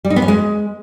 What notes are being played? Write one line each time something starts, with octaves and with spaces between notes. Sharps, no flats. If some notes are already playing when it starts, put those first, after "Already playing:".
G3
D#4
B3
C#4
G#3